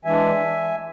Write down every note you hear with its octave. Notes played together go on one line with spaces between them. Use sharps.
E3 G#3 D4 E5 G#5